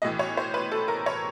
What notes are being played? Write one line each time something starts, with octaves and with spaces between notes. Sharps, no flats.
B1 A2 E3 D#5
C#5
C5
B4
A4
A#4
C#5